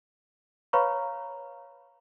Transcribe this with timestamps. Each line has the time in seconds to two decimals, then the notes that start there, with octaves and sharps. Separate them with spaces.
0.73 B4 C#5 F5 A#5 B5 C#6